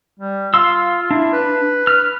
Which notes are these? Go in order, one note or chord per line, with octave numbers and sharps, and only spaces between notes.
G3
F4 F5 C6 E6
D4 E4
B4
F6